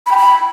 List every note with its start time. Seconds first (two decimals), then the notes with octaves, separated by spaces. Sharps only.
0.06 B5
0.12 G5
0.17 B5